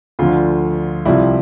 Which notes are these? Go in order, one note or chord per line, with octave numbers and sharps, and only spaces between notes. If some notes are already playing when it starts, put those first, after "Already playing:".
D2 D3 F3 F4
C2 C3 F3 E4